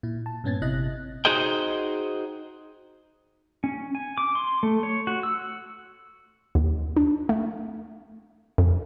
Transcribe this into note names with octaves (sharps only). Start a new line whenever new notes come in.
A#2 E4
A5
G2 A#2 B3 C#4 G#6 A6
G#1 C3 E4 D#5 F#6 A#6
D#4 F#4 G#4 C5 D#5 G5
C#4
G#5
D6
C6
A3
C#5
F#4
E6
D#2
D4
A3
F2